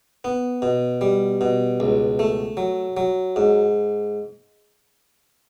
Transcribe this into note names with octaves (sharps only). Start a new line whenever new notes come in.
B3
B2
G3
B2
C#2
A3
F#3
F#3
G#2